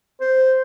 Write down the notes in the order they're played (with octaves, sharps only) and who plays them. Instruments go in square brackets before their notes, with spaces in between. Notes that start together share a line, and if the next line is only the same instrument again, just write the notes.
[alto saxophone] C5